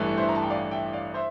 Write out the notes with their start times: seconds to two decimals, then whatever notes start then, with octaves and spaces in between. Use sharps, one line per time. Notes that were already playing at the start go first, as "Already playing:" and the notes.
Already playing: A1 G2 E3 A3
0.18 C5 E5
0.29 A#5
0.35 A5
0.42 G5
0.50 D5 F5
0.71 E5 G5
0.93 D5 F5
1.14 C5 E5